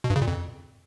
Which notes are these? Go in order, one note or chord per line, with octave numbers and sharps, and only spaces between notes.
B2
G2
C#3
A#2
F2